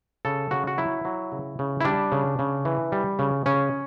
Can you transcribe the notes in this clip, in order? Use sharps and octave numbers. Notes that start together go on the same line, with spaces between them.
C#3 A4
C#3 F#4
F#4
F#3 E4
F#3
C#3
C#3
E4
G3 D4
C#3
C#3
E3
G3
C#3
C#3 C#4